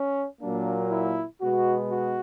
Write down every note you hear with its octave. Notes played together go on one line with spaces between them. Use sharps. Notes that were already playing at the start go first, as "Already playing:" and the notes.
Already playing: C#4
A#2 F#3 A#3 D4
E4
B2 G#3 B3 F#4
F#4